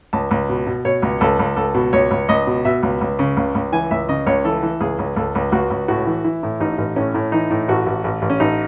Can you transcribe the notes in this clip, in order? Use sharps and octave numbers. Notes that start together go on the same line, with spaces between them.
C#2 A5
C#2
B2
B2
B2 C#5
C#2
C#2 A4
C#2
C#2 A4
B2
C#2 C#5
C#2
C#2 D#5
B2
B2 E5
C#2
C#2
C#3
C#2
C#2
E3 G#5
C#2 E5
C#3 D#5
C#2 C#5
E3 A4
E3
C#2 G#4
C#2
C#2 A4
C#2
C#2 F#4
C#2
A2 F#4
E3
E3 E4
A2
A1 D#4
A1
A2 C#4
A2
E3 D#4
A2
A1 F#4
A1
A1
A1
C#4
A1 D#4